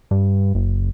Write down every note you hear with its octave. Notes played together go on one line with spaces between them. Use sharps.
G2
F#1